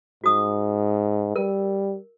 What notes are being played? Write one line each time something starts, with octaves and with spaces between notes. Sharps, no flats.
G#2 F#4 D#6
G3 A#4